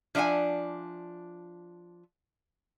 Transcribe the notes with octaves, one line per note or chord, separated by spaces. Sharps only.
F3 D4 E5 F#5 G#5